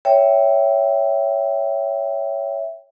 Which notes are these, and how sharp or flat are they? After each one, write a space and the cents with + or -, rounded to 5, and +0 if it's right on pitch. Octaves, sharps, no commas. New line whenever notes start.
C#5 +10 E5 +0 G5 +0